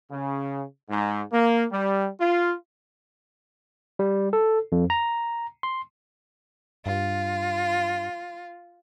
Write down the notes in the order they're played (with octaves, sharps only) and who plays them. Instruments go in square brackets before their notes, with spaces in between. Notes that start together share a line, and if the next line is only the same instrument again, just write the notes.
[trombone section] C#3
G#2
A#3
G3
F4
[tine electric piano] G3
A4
F2
A#5
C6
[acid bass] G2 [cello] F4